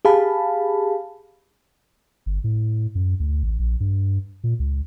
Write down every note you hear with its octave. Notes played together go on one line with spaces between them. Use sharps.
G4 G#4 F5 A5 B5
G1
A2
F#2
D2
A1
A#1
G2
A#2
C#2